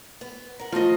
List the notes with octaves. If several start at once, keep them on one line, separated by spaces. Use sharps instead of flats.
B3
A#4 F#5
F3 A3 F4 D#5